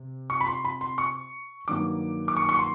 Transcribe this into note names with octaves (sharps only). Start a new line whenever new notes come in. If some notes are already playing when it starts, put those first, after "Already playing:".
Already playing: C3
C#6
B5
C6
B5
C6
C#6
G2 D#3 F#3 A#3 D6
D6
C#6
C#6
C6